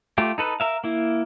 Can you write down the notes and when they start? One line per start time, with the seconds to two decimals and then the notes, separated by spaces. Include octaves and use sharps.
0.18 A3 F4 G4
0.38 D#4 A4 B4
0.60 A#4 E5 F5
0.84 A#3 E4